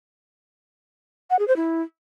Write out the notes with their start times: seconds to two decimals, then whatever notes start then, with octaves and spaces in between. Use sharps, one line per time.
1.30 F#5
1.39 G#4
1.48 C5
1.56 E4